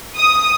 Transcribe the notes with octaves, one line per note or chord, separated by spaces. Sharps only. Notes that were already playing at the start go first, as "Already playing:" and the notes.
D#6